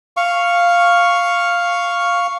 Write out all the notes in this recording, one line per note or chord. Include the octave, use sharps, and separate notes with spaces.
F5 C#6